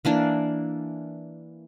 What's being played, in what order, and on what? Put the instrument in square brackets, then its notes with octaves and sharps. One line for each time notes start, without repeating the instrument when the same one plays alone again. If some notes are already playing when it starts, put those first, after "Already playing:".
[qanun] E3 A#3 D4